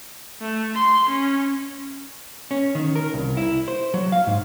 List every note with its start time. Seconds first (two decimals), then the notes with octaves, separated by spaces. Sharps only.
0.42 A3
0.75 C6
1.09 C#4
2.51 C#4
2.75 D#3
2.96 A#4
3.14 C2
3.37 E4
3.68 C5
3.94 F#3
4.12 F5
4.27 G#2